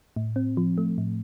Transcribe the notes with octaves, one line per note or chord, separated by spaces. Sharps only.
A2
C4
F3
A3
A2